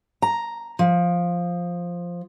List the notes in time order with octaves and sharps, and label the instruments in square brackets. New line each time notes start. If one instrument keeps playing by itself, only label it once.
[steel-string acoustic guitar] A#5
F3